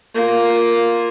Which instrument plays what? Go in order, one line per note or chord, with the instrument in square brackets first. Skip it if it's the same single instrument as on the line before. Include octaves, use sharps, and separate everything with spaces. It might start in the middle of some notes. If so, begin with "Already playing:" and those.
[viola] A#3 F4